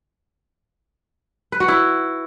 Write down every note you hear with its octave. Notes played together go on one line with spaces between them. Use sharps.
B4
F#4
E4